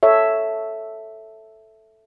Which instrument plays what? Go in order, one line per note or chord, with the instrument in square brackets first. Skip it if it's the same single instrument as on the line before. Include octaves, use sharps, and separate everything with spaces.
[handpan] A4 C#5 E5